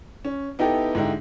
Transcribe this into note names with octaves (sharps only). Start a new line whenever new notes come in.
C#4
B3 D#4 E4 G4 A4
G#2 D3 D#4 E4 G4